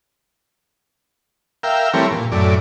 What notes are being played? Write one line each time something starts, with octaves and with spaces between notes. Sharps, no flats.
A#4 E5 F5 G5
E3 G3 A3 C4 A#4 C#5
A#2
F#2 A2 D5